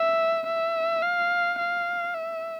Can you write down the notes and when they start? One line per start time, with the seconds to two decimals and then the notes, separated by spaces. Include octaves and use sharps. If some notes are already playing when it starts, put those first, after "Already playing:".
Already playing: E5
0.47 E5
1.02 F5
1.59 F5
2.14 E5